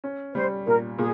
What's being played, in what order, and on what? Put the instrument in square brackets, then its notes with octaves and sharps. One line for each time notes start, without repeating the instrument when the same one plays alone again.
[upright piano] C#4
[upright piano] G3 [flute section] C5
[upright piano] A#2 [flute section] A#4
[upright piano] A#2 [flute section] G#4